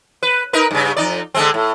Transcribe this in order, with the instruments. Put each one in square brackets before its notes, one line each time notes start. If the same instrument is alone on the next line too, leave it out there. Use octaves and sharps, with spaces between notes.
[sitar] B4
D#4 A#4 B4
G2 C#3
F2 D#4 D5
D3 G#3 C4
A2